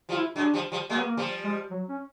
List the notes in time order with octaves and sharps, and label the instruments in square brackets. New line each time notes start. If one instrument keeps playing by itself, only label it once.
[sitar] F3 G3
[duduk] F4
E4
[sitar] F#3 G#3 [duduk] D4
[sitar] F3 G3
F3 G3
[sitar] F#3 G#3 [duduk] A#3
[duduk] B3
A#3
[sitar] F3 G3
[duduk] G#3
F#3
C#4